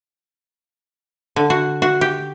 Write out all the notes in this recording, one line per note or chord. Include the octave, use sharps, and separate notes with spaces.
D3
F#4
F#4
G4